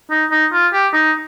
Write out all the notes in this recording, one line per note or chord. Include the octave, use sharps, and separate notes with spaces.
D#4
D#4
F4
G4
D#4